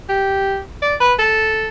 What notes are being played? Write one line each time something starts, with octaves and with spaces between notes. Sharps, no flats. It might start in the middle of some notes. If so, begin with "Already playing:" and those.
G4
D5
B4
A4